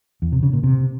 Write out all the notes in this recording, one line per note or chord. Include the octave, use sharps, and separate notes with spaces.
E2
C3
C#3
A#2
C3